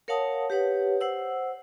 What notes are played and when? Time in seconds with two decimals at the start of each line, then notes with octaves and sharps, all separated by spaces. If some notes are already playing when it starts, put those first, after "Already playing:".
0.08 A#4 C#5 F5 F#5 A5 D#6
0.50 G4 B4 C#5 F#5
1.01 C5 F#5 E6